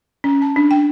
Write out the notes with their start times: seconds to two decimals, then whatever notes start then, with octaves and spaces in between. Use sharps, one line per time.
0.24 C#4
0.42 A5
0.56 D4
0.71 G5